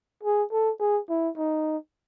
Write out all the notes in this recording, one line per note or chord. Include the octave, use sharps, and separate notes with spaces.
G#4
A4
G#4
E4
D#4